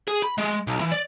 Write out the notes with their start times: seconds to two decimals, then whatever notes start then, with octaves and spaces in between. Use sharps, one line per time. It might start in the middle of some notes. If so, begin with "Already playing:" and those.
0.08 G#4
0.22 B5
0.38 G#3
0.67 B1
0.81 E3
0.92 D5